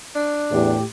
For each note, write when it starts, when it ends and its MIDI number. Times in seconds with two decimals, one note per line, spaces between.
0.15 0.74 62
0.52 0.75 40
0.52 0.83 45
0.52 0.83 67